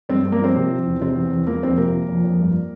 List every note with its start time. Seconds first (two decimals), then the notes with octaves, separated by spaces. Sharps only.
0.09 G2 C4
0.25 G2
0.32 A#3 A#4
0.40 F3 C4 C5
0.56 C3
0.71 F3
0.86 E2
1.01 C3 C4 C5
1.16 E2
1.32 E2
1.47 F3 A#3 A#4
1.63 F2 C4 C5
1.77 C3 A#3 A#4
1.93 F3
2.08 F2
2.24 F2
2.39 G2